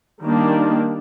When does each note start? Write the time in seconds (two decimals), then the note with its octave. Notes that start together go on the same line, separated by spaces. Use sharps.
0.22 D#3 G3 A#3 D4